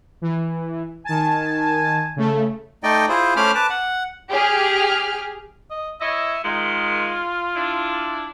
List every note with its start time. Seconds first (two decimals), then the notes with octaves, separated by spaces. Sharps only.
0.22 E3
1.05 D#3 G#5 A5
2.16 C#3 A3
2.83 A3 D#4 D5 D#5 G5
3.09 E4 F4 G#4 C5
3.36 A3 C#4 C5 B5 D6 F6
3.55 B4 A5 D6
3.70 F#5
4.30 G4 G#4 F6
5.71 D#5
6.01 E4 C#5 D#5 E5
6.44 D#3 G#3 F4
7.56 D4 E4